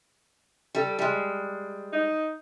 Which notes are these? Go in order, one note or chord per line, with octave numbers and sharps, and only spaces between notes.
G3 A4
G3 G#3
D#4